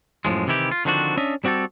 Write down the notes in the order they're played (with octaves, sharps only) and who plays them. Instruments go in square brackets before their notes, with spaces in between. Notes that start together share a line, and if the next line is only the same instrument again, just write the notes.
[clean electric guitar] F#2 A2 F3 G#3
C3 D#3 E3 E4 G4
F4
D3 D#3 F3 C4 D4 F#4
C#4 D4 D#5 E5
G3 C4 F#4 G4 A4